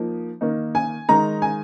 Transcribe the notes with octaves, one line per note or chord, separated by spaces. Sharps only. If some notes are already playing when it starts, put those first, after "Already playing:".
Already playing: F3 A#3 D#4
D#3 A#3 D#4
G#5
D#3 G#3 D#4 A#5
G#5